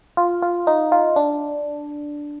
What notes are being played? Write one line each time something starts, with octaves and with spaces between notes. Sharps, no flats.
F4
F4
D#4
F4
D4